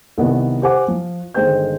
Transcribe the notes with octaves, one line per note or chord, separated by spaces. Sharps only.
C2 D#3 B3
G4 C5 F#5 G#5 D6
F3
G1 D#3 G#3 C5 G5 G6